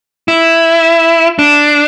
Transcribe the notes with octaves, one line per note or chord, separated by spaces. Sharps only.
E4
D4